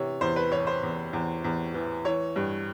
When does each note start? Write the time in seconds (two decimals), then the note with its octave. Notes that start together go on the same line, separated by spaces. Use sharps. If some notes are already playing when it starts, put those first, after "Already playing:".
Already playing: C3 E3 C#5
0.21 E2 C5
0.36 B4
0.52 E3 C#5
0.67 C5
0.83 E2
1.13 E2
1.44 E2
1.74 E3
2.05 E3 C#5
2.36 G2